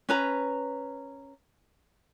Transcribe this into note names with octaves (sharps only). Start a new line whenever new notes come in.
C#4 B4 A#5